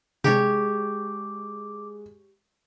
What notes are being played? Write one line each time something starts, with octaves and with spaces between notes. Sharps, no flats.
C3 G#3 D4 G4 C#5 D6